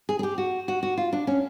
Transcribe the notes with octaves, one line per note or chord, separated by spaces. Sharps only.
G#4
G#4
G4
F#4
F#4
F#4
F4
D4
C#4